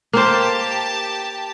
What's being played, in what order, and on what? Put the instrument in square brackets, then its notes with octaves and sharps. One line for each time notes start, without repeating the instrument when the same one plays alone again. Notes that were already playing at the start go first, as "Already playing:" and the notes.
[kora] A#3 C5 [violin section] G4 A5